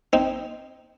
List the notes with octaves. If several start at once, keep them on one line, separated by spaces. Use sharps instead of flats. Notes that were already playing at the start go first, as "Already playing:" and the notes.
C4 D#4